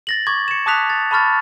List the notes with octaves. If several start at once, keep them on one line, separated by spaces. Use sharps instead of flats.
A6 A#6 F#7
C#6 D6 G#6
C#7 E7
A5 D6 D#6 F#6 B6 F7
A6
A5 B5 C#6 F6 A6